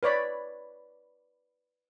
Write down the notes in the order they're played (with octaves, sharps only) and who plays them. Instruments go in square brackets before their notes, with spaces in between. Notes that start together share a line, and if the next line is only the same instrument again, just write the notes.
[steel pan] B4 C#5 D5 B5